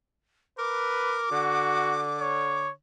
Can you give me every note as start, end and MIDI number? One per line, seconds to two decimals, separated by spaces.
0.58 1.29 70
0.58 1.21 71
0.58 2.67 86
1.31 2.74 50
1.31 2.07 66
2.20 2.72 73